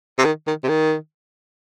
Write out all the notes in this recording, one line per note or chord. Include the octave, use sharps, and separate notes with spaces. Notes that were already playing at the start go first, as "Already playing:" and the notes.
C3
D#3
D#3
C3
D#3